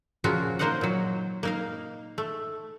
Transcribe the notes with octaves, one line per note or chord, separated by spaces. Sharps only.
A#2 C#3 F3 A#3 F4 F#4
A#3 D#4 C5 D#5 F5 F#5
A#2 F#3
A#3 D#4 F5
A3